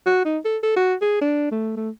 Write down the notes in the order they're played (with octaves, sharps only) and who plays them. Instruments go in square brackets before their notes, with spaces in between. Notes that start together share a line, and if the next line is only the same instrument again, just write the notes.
[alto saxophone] F#4
D#4
A4
A4
F#4
G#4
D4
A3
A3